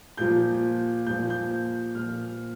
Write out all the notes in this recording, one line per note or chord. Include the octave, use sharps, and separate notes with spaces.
A#2 F3 G6
A#2 F3 G6
G6
A#2 F3 F6